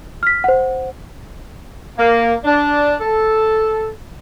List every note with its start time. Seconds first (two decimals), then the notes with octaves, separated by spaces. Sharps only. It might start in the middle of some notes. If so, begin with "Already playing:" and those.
0.23 F6 B6
0.44 C5 F#5
1.98 A#3
2.44 D4
3.00 A4